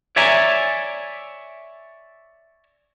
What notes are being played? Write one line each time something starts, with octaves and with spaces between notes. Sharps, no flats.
C#5 D5 E5 G#5 A#5